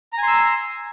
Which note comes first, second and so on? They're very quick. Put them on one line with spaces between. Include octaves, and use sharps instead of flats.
A#5 G#5 C6 E6